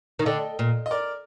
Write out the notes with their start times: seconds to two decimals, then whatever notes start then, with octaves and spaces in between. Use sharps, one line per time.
0.19 D#3
0.26 D3 D#5 G5
0.59 A#2
0.86 D#5
0.91 A#4 D5